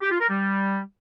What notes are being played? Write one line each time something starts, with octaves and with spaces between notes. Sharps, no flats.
G4
F4
A#4
G3